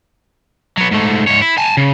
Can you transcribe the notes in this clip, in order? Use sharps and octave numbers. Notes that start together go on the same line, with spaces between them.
F#3 B3
G#2 A3
G#2 C#5
E4
G#5 A5
C#3